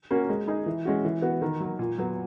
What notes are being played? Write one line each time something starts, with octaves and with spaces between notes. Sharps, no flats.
A#3 C#4 F#4
G#3
D#4 G#4
E3
G#3 C#4 F#4
E3
B3 F#4
D#3
F#3 A#3
A#2
F#3 B3